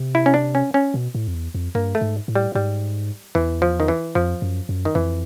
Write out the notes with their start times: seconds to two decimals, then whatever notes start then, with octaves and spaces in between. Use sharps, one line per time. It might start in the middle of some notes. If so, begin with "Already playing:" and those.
Already playing: C3
0.15 E4
0.26 C#4
0.34 D4
0.55 C#4
0.74 C#4
0.94 B2
1.15 A2
1.28 F2
1.34 E2
1.55 F2
1.75 G2 A#3
1.95 A3
2.01 G#2
2.28 A2
2.35 G3
2.55 G#2 G3
3.35 E2 E3
3.62 F3
3.80 D#3
3.88 E3
4.15 F2 F3
4.42 F#2
4.69 F#2
4.85 D#3
4.95 F2 E3